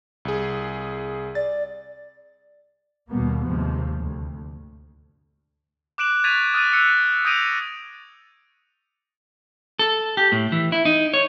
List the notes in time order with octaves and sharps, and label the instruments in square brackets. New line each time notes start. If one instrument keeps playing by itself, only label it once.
[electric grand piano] C2 G#4
[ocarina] D5 [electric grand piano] A6
[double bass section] D#2 B2 G3 A#3 B3
D#2 G#2 C3 F3
D2
[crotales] D6 F#6 D7 E7 F#7
C#6 G#6 A6 B6 D#7 F7
D#6 F6 F#6 G#6 A6 D#7
E6 F#6 C#7 F7
D#6 G6 A#6 D7 D#7 F7
[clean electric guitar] A4
G4
A2
E3
E4
D#4
C#5